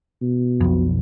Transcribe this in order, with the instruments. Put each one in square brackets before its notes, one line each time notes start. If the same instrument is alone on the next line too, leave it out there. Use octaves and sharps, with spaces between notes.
[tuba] B2
[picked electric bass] B1 F2